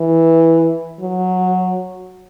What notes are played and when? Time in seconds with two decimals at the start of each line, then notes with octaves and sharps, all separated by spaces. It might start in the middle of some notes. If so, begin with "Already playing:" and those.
Already playing: E3
1.01 F#3